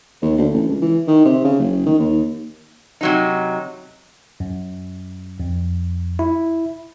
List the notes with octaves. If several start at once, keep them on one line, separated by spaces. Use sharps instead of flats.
D#2
D2
A1
C#2
E3
D#3
C3
C#3
F#1
D#3
D#2
C3 F#3 D#4
F#2
F2
E4